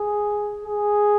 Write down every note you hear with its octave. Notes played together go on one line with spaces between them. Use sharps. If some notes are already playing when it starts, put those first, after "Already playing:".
Already playing: G#4
G#4